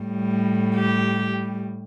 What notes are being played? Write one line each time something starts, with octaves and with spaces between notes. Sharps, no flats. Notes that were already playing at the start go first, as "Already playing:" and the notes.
Already playing: A2 G3
G4